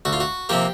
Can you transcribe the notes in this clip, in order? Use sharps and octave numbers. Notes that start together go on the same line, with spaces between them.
D2 F#4
F4
F#4
C3 F3 A#3 G4